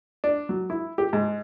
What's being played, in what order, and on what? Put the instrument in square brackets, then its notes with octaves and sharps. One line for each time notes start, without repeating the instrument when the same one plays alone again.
[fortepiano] D4
F#3
E4
G4
G#2